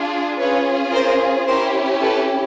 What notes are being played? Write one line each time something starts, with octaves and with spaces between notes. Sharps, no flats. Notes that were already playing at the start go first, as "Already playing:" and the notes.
Already playing: D4 F4 G#4
C#4 F4 G#4 B4 C#5
A#4 C5
C#4 E4 G4 A#4 C5
A4 B4